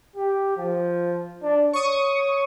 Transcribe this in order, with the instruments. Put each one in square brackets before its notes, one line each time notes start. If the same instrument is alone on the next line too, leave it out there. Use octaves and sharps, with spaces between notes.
[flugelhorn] G4
F3
D4
[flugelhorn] C#5 [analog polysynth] C#6 D#6